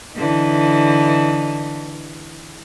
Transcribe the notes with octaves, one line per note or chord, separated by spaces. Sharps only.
D3 E3 D#4